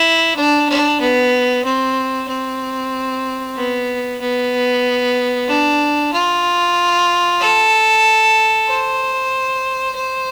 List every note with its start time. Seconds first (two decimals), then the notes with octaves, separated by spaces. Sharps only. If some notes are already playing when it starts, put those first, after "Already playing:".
Already playing: E4
0.36 D4
0.69 D4
1.00 B3
1.65 C4
2.28 C4
3.56 B3
4.21 B3
5.48 D4
6.13 F4
7.40 A4
8.68 C5
9.95 C5